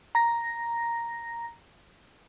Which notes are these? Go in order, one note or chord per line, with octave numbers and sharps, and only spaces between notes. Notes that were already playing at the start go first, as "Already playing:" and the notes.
A#5 A#6